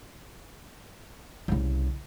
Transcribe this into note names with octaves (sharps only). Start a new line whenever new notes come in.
C2 C#3